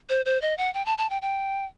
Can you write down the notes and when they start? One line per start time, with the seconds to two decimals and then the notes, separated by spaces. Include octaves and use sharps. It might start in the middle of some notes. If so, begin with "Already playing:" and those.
0.10 C5
0.25 C5
0.42 D#5
0.58 F#5
0.74 G5
0.86 A5
0.98 A5
1.10 G5
1.22 G5